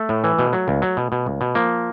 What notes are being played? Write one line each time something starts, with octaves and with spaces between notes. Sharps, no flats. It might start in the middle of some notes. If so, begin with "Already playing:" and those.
Already playing: A3
A2
E3
B2
F#3
C#2
F#3
B2
B2
C#2
B2
F3 A#3